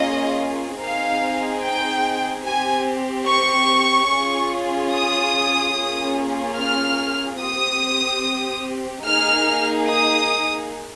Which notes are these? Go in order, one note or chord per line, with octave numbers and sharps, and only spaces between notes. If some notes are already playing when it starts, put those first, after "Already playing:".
Already playing: A#3 C#4 F4 G#4 D#5
C4 D#4 G#4 F5
G5
C4 G4 G#5
C#6
C#4 F4 G#4
D#6
A#3 C#4 F4 G#4
F6
C4 G4 D#6
A#3 D#4 G#4 F6
D#6